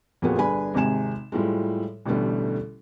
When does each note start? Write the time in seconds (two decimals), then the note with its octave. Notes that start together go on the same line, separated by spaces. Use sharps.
0.22 F2 A#2 A#3 B3 F#4 G#4
0.38 G1 D4 G#4 B4 G#5 B5
0.74 G#1 C3 G#3 G#5 E7
1.32 A2 F3 G3 G#3
2.06 A1 B2 D3 G3 A3